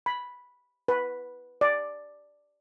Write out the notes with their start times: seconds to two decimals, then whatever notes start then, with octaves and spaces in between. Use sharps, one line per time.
0.06 B5
0.88 B4
1.61 D5